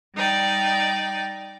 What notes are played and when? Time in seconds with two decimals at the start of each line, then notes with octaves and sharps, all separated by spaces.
0.15 G3 D#4 D5 G5